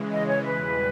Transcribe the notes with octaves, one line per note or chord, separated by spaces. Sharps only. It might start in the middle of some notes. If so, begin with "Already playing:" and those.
Already playing: C#3 E3 G#3
D#5
C#5
E2 B2 G3 B4